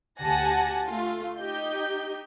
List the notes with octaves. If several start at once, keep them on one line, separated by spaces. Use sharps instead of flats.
D2 G4 F#5 G#5 A5 A#6
A3 F4
D#4 G4 D#5 G6